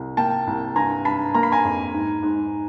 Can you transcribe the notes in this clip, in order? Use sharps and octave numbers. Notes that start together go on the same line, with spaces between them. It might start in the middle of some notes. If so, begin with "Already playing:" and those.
Already playing: C2
A#3 G5 A5
C2
G2 G#5 A#5
G2 A5 B5
A#3 A#5
B5
G#5 A#5
F2
G#2
G#2